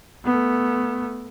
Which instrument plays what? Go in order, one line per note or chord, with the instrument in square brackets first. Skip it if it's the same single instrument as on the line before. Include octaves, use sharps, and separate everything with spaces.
[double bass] A3 B3